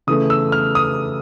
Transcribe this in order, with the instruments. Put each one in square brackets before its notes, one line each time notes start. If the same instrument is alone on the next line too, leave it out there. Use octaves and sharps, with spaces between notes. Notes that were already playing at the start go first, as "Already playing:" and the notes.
[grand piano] C#3 E3 A3 D#6
E6
F6
D#6